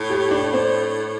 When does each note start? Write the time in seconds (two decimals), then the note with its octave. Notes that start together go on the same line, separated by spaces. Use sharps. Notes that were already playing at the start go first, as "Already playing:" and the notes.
Already playing: A2
0.10 G4
0.31 D4
0.53 C4